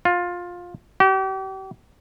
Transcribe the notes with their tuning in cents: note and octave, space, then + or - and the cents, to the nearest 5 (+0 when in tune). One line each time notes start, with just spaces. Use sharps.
F4 +15
G4 -40